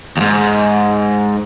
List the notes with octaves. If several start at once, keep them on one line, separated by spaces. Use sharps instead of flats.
D#2 G#2